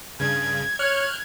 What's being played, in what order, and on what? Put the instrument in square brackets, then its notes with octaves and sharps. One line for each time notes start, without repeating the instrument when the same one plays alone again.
[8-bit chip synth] G2 C#3 [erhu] G#6
[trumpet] C#5 [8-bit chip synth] F6 F#6